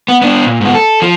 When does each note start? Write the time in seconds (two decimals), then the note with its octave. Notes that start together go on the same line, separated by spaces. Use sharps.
0.08 B3
0.22 B3 D4
0.46 A#2
0.61 G#2 B3
0.74 A4
1.02 F3